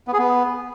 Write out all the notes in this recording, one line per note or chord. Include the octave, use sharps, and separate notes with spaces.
B3
G#4
B3